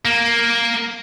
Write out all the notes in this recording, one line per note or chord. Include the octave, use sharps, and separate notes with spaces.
A#3